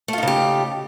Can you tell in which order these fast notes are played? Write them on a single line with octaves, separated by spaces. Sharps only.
A3 F4 D#4 C#3 G4